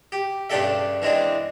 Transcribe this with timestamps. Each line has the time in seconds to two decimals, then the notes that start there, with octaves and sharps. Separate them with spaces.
0.12 G4
0.50 G2 C#3 D4 G4 A4 E5
1.02 E3 G#3 C4 D4